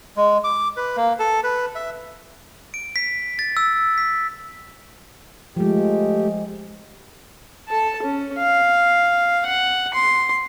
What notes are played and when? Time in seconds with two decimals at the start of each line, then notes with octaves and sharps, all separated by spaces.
0.17 G#3
0.44 D6
0.77 B4
0.97 A#3
1.19 A4
1.44 B4
1.75 E5
2.74 D7
2.96 B6
3.39 A6
3.57 E6
3.98 B6
5.56 F3 G#3 A3 G4
7.68 A4 A5
8.02 C#4
8.38 F5
9.46 F#5
9.94 C6